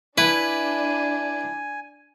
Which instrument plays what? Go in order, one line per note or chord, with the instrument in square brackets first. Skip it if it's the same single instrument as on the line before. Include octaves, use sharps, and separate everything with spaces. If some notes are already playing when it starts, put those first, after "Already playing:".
[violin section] D4 [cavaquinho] E4 [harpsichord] B4 [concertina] G#5